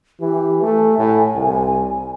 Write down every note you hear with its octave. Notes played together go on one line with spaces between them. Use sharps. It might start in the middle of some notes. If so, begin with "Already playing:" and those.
E3 G4
A3 G#5
A2
C2